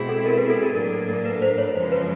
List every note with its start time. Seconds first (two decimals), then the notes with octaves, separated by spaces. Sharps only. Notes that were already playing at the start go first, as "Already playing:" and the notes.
Already playing: B2 G#3 C4 E4 G#4
0.09 A4
0.26 A#4
0.37 B4
0.50 A4
0.63 A#4
0.75 A2 F#3 A#3 D4 A#4
0.93 A4
1.09 A#4
1.25 B4
1.42 C5
1.58 C#5
1.76 F#2 C#3 F3 G#3 C5
1.92 B4